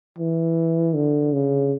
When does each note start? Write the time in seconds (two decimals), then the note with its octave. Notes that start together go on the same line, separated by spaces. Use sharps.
0.18 E3
0.94 D3
1.33 C#3